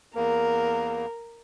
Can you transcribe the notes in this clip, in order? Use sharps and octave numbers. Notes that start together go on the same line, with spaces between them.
E2 A#3 A#4